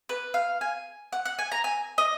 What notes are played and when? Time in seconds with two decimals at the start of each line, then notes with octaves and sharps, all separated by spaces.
0.09 B4
0.34 F5
0.61 G#5
1.13 F#5
1.25 F#5
1.39 G#5
1.52 A#5
1.64 G#5
1.98 D#5